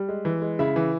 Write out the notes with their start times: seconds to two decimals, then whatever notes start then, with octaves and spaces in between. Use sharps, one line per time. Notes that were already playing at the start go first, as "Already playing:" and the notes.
Already playing: G3
0.09 G#3
0.25 E3
0.42 G#3
0.59 C#3 E4 E5
0.76 E3